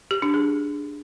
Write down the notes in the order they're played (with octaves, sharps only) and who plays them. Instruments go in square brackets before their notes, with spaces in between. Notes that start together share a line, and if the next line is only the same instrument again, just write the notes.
[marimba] G4
D4
G#4